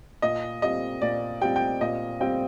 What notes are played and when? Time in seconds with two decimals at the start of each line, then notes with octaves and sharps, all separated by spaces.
0.22 A#2 D#5
0.62 G3 C4 F4 D#5
1.02 A#2 D5
1.41 G3 C4 F4 G5
1.56 G5
1.81 A#2 D#5
2.20 G3 C4 F4 G5